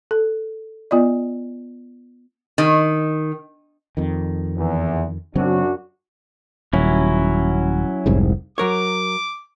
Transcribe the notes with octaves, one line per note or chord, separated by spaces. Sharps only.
A4
B3 F4 D5 D#5
D#3
F2 D#3
E2
F#2 C#3 F#3 C4 D4 F#4
D#1 F#3 C#4 E4
F1 C2 G#2
F#3 A#4 C#5 D6